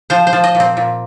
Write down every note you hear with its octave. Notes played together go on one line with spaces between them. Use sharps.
F3 C5
C5
F3
D#5
A#2
C4
A#2